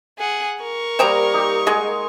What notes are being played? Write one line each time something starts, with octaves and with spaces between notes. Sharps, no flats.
G#4 F#5
A#4 C#6
G3 A#3 C5 G5 A#5 D#6
D#4 G4
G#3 G#4 D#5 F#5 G#5